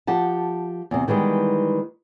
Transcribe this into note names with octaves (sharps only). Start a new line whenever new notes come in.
F3 G4 F#5 A5
E2 C3
D#3 E3 G3 G#3 B3